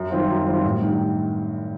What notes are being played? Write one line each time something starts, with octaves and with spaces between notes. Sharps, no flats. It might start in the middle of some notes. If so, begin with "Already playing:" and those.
Already playing: F#2
D#3 G3 C4 F4
F#2
D#3 G3 C4 F4
A1
G2 D#3